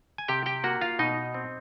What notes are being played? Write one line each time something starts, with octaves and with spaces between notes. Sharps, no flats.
G#5
C3 G4 G5
G4 G5
A#3 F#4 F#5
F4 F5
B2 D#4 D#5
C4